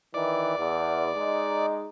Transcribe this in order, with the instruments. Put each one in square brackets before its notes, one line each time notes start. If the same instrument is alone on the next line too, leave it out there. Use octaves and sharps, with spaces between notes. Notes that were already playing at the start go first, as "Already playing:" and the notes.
[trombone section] D#3 E3 [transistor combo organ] D5
[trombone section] E2
G#3 D#4